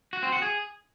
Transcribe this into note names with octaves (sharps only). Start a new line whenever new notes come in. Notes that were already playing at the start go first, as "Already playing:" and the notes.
F#4
C4
F#4
G#4